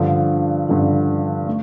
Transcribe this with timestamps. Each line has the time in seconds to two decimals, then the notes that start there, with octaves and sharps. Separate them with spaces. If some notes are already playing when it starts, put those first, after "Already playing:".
Already playing: G2 D3 F3
0.69 G2 D3 F3
1.47 A3